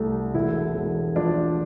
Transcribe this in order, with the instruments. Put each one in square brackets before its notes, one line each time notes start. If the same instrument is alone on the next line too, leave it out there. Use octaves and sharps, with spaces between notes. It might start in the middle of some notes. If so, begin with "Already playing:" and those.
Already playing: [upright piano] C2 A3
[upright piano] E1 [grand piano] E4
[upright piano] E1
[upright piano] F3 [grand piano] D4